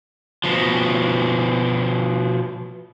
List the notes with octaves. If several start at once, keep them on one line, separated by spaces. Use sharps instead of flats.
B2 F3